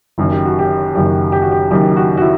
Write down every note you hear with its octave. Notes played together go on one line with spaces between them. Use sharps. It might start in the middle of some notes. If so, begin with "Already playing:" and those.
F#1 F#2 D#3
G4
F#4
G4
F#1 F#2 D#3 G4
G4
F#4
G4
F#1 F#2 D#3 G4
F#4
F#4
E4